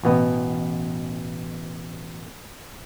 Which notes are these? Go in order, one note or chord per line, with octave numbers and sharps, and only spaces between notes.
A1 B2 B3